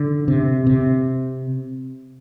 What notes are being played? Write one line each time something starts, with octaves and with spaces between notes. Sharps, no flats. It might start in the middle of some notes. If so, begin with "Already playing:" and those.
Already playing: D3
C3
C3